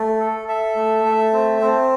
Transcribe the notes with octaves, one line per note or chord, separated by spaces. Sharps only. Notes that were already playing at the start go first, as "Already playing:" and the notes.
Already playing: A3
A4
A4 E5
A3
A3
C4
C4